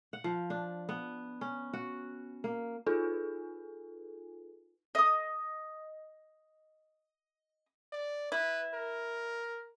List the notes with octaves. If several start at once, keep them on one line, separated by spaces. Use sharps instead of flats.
F#5
F3
D4
B3
C#4
F#4
A#3
D#4 F4 G#4 A4 B4 G#5
D#5 D#6
D5
E4 B4
A#4